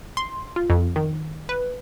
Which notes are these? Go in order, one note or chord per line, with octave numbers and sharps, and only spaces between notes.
C6
F4
F2
D#3
B4